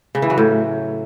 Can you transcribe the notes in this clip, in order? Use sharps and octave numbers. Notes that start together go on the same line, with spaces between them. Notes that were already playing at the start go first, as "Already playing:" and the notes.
C#3
E3
F#3
A2